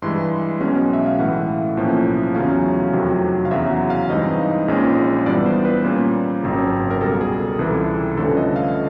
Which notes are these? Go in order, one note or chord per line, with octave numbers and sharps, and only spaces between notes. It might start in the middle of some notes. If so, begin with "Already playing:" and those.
G2 E3 G#3 C6
B1 B2 G#3 C#4
E5
F5
A2 E3 A3 F#5
B1 A2 F3 A#3 C#4
E2 C#3 F#3 A3 C#4 F5
F2 C3 D#3 F#3
F5
E2 C#3 F#3 E5
F#5
F5
G2 E3 G#3 C4 D#4 D#5
A#1 A#2 F3 G#3 C#4
G2 E3 G3 B3 D5
C5
B4
A#2 G3 A#3 C#4
G#1 F#2 C#3
A#4
C#2 B2 G3 A4
G#4
A4
A#4
C#2 C3 E3 G3 A4
G2 D3 F3 A3 C#4 A4
D#5
F5